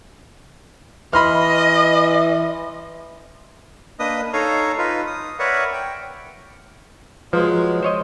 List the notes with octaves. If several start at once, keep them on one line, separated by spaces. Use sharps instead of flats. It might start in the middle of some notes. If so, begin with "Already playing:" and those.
E3 D#5 B5 C6 F6
A#3 D4 B4 D#5 D#6
D#4 A4 C#5 F5 A#5
D#4 F4 B4
D#6
A#4 B4 C#5 D5 E5 F#5
G5
F3 F#3 G#3 B4 A#5
C5 C#5 D#5